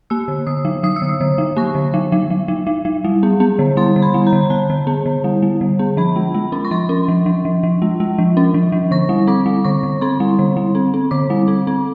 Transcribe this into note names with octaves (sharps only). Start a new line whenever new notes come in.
A#3 E6
D3
D3 D#6
F#3
F#3 D#6
E6
D3
D#6
D3
F#3
A#3 C#6
D3
F#3
F#3
F#3
F#3
F#3
F#3
G3
B3
B3
D3
G3 C6
D3
B5
G3
A#5
D3
D3 A5
D3
B3
D3
G3
G3
D3
B3
F3 B5
G#3
G#3
C#4
C#6
F3 C6
C#4
F3
F3
F3
F3
G#3
G#3
F3
C#4
F3
F3
D3 C#6
G3
C4 D6
G3
D3 C#6
D3
C4 C6
G3
D3
G3
C4
C4
D3 D6
G3
C4
C4